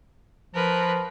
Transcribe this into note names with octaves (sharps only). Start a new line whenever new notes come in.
F3 A#4 B4